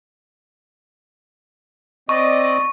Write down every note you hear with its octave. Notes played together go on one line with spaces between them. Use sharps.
C4 D5 D#5 C#6